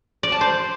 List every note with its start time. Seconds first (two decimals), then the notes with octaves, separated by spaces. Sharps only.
0.23 D5
0.32 A5
0.41 C5